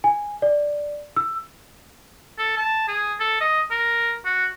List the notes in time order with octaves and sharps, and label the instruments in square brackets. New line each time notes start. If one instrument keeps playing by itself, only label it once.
[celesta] G#5
D5
E6
[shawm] A4
A5
G#4
A4
D#5
A#4
F#4